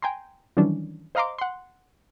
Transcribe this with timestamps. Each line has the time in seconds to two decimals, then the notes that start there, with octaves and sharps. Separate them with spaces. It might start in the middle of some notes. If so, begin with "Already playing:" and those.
0.02 G5 G#5 A#5 C6
0.57 D#3 E3 F#3 G3 C#4 D4
1.15 C5 D#5 F5 A#5 C6 D6
1.39 F#5 C6